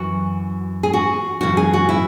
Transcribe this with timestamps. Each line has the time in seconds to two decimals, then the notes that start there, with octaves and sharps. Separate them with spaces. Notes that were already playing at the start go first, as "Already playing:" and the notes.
Already playing: F#2 E3 F#4
0.83 G#4
0.93 F#4
1.41 F#2 C#3 E3 F#4
1.57 G#4
1.73 F#4
1.89 E4